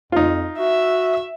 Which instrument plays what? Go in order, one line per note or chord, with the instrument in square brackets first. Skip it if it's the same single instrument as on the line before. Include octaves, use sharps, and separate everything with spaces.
[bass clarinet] F2 [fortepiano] D#4 F4
[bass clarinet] F#4 [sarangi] E5